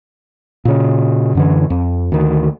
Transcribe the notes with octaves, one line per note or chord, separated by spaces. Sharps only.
A#2 C#3
F#2 D3 E3
F2
D2 D#3